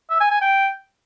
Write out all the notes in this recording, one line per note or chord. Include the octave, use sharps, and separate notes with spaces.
E5
G#5
G#5
G5